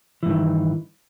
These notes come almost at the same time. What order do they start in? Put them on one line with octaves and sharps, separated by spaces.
E3 G2 D#3